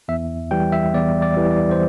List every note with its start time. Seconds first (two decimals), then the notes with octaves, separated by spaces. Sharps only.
0.08 E2 E5
0.51 E3 G3 G5
0.72 E5
0.94 E2 D5
1.22 D5
1.37 E3 G3
1.51 D5
1.71 C5